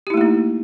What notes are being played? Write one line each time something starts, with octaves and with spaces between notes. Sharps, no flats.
A3 A#3 D#4 E4 G4